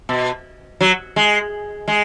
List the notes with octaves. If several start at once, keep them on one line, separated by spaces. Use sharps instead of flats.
B2
F#3
G#3
G#3